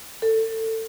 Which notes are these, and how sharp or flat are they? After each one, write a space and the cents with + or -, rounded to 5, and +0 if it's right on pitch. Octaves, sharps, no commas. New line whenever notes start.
A4 +25